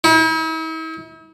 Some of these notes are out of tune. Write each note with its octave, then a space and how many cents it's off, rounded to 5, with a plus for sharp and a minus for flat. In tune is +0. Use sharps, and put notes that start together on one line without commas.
E4 -45